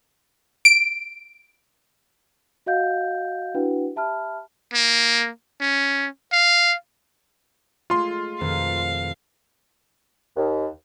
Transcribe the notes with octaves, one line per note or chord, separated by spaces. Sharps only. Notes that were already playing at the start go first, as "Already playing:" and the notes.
D7
F#4 D#5 F5 F#5 G6
D4 E4 F#4 B4 F#5 G5
G4 E5 A5 B5 F6
A#3
C#4
F5
G#3 A3 F4 C6
F2 B2 D#3 F5
D#2